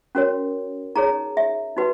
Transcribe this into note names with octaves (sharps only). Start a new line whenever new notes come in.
C#4 F#4 A#4 C#5
D#4 G#4 C#5 A#5
E5
D#4 F#4 B4